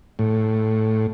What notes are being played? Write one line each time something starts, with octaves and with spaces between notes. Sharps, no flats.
A2